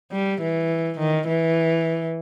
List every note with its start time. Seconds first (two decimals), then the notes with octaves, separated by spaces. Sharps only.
0.12 G3
0.41 E3
0.99 D#3
1.27 E3